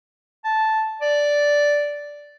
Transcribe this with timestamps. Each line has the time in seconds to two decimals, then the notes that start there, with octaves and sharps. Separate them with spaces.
0.44 A5
1.01 D5